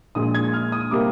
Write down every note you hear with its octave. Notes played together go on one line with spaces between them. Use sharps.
A#1 A#2 G#3 D#6
G#6
F6
D#6
C3 G3 A#3 D6